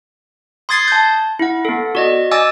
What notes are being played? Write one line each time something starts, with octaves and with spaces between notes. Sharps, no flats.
C6 D#6 G#6 A6 C7
A5 G6
E4 F#5
B3 A4
F#4 D5 D#5
D#5 G#5 D6 E6 A6